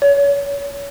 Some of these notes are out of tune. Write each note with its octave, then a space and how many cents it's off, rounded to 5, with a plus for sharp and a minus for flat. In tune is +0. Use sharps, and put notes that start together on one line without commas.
C#5 +30